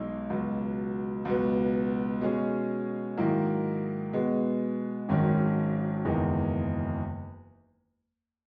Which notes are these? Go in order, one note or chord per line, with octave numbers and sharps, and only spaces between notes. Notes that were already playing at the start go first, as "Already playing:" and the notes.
Already playing: B1 B2 G#3 D#4
C#2 B2 F#3
C#2 B2 F#3 B3
B2 G#3 C#4 G#4
G#2 D#3 F#3 A#3 E4
B2 G#3 B3
G#1 G#2 D#3 F#3 C#4
F#1 E2 D#3 G#3 D#4